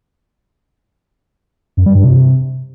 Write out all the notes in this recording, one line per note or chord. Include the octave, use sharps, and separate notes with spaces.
F#2
G3
G2
C3